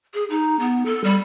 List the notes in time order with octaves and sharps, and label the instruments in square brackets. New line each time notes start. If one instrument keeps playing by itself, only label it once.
[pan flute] G#4
D#4
B3
A4
G3